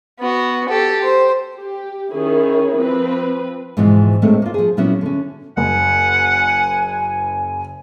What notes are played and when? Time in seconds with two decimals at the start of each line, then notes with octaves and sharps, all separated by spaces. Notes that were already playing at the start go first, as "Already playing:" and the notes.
0.19 B3 F#4
0.69 G4 A4
1.04 C5
1.55 G4
2.11 D#3 C#4 E4 G#4
2.77 F3 C4 B4
3.77 G#2 B2 E3 F3
4.22 A2 D#3 G#3 A3 C4
4.42 A#3 F4
4.54 F3 G#4
4.77 A#2 F#3 B3 C#4 E4 F#4
5.01 D3 C#4
5.57 F#1 F#5 G#5